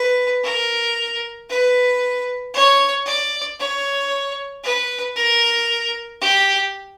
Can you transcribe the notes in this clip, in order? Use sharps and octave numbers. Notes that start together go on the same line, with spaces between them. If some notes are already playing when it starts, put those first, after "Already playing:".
Already playing: B4
A#4
B4
C#5
D5
C#5
B4
A#4
G4